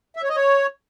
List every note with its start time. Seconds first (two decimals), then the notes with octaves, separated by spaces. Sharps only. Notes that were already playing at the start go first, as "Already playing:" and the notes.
0.16 E5
0.23 C#5
0.30 D#5
0.36 C#5